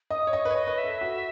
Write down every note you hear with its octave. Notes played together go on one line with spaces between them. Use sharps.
D#5 D#6
C#5
D#5 C#6
B4
C#5
D#5
B4
E5
A4
F#4